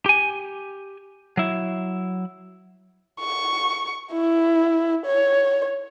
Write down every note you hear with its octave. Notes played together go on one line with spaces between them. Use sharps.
G4 G#5
F#3 E4
C#6
E4
C#5